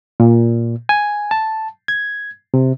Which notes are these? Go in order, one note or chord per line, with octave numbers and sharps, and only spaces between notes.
A#2
G#5
A5
G#6
C3